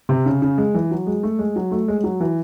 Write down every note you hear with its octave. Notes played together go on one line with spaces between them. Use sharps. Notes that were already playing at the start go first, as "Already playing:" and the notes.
C3
C#3
C#3
G#3
E3
F#3
G#3
A3
G#3
F#3
A3
G#3
G#3
F#3
E3